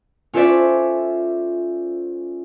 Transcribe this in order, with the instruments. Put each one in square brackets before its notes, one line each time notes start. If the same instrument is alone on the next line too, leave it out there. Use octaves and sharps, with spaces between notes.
[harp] C#4 F4 A4 C5 D5 E5